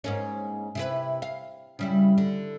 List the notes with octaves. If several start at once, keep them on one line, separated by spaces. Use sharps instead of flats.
G#2 A#3 C#4
C3 E4 B4
F5
C#3 G3 E4
D3